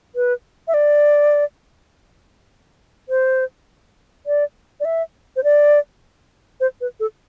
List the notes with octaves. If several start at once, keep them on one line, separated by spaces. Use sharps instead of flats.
B4
E5
D5
C5
D5
D5
E5
C5
D5
C5
B4
A4